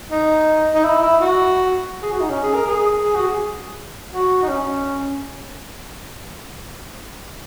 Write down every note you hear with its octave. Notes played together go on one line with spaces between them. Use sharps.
D#4
D#4
E4
E4
F#4
G#4
F#4
D#4
C#4
G#4
A#4
G#4
G#4
F#4
G#4
F#4
D#4
C#4